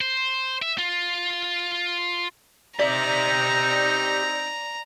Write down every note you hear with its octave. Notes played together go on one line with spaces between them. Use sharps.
C5
E5
F4
C4 D#4 G4 D5 E5 A#5